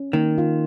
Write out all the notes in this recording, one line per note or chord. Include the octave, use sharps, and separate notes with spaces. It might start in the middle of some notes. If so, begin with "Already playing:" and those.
Already playing: C#4
D#3 A#3
F4